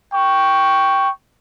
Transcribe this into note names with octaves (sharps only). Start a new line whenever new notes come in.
G5 C#6